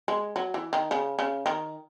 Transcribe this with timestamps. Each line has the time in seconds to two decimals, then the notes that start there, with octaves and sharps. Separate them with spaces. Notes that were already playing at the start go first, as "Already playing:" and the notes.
0.08 G#3
0.36 F#3
0.54 E3
0.73 D#3
0.91 C#3
1.19 C#3
1.46 D#3